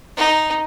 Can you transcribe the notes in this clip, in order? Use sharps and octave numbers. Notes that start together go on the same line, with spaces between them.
D#4